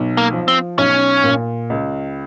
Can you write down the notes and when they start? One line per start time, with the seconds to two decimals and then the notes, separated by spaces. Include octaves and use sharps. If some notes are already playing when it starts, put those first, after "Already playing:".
Already playing: B1
0.17 A#3
0.33 F3
0.48 C4
0.78 B1 C#4
1.24 A#2
1.70 C#2